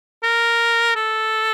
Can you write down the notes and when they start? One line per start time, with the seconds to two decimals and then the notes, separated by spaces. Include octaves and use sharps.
0.23 A#4
0.95 A4